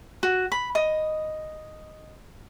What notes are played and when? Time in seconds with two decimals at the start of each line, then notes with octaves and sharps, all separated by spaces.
0.23 F#4
0.52 B5
0.75 D#5